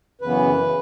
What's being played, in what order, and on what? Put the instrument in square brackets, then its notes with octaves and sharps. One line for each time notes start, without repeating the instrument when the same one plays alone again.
[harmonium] F#2 C#3 E3 B3 B4